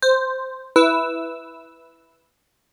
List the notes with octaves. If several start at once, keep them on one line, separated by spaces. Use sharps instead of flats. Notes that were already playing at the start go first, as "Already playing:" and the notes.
C5
E4 B4 E6